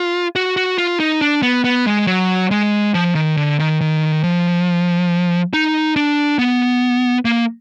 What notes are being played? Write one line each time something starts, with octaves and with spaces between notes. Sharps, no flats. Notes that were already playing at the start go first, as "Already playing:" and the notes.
Already playing: F4
F#4
F#4
F4
D#4
D4
B3
B3
G#3
F#3
G#3
F3
D#3
D3
D#3
D#3
F3
D#4
D4
B3
A#3